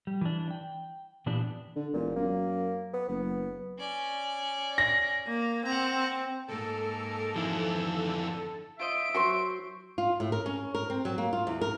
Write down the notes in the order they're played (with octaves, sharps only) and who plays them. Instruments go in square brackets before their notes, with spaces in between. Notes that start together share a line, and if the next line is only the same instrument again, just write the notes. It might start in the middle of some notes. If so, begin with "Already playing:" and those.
[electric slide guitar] G3
E3 D4
G5
A#2 E3 B3 D4 G4
[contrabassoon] D3
[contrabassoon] E1 [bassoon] A#2
[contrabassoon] F#2 [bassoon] A#3
[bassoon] B3
[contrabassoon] F#1 [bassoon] B3
[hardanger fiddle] C#4 D5
[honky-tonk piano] A#6
[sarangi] A#3
[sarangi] C4 [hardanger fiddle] F#5 A#5
[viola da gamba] G#2 A#3 A#4 [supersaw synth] A4
[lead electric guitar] F2 E4 [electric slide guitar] D#3 E3 G#3
[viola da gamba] D3
[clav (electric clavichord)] F4 C5 D#5 [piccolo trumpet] E5 [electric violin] D7
[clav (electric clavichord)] F#3 F#4 [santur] C5 C6 C#6
[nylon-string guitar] F4
A2
A#4
C#4
A#4
C4
F#3
A#3
F4
E2
A#4